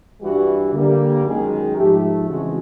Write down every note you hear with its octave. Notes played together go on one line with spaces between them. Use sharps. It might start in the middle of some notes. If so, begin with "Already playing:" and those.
G2 E3 G3 F#4
D3 G3 A#3
F#2 D#3 G#3 G#4
G#2 F3 A3 G4
C#3 E3 G#3 C4 F#4